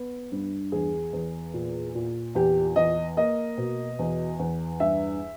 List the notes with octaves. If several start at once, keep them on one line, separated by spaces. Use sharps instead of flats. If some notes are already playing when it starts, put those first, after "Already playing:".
Already playing: B3
G2
E2 G#4
E2
A#2
A#2
E2 G4
E2 D#5
A#3 D#5
B2
E2
E2
G2 E5